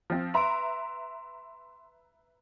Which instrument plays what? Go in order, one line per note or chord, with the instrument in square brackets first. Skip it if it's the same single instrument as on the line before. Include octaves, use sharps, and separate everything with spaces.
[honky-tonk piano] F3 C4
[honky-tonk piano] B4 E5 A#5 [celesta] C6 D7